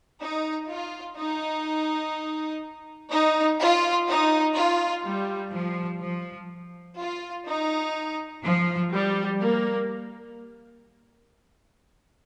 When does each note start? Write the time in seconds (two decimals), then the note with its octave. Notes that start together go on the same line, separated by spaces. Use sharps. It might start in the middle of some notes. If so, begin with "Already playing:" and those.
0.19 D#4
0.68 F4
1.16 D#4
3.10 D#4
3.59 F4
4.07 D#4
4.55 F4
5.04 G3
5.52 F3
6.01 F3
6.98 F4
7.47 D#4
8.44 F3
8.92 G3
9.40 A#3